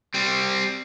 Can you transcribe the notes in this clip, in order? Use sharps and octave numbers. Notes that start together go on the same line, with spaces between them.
G3 C4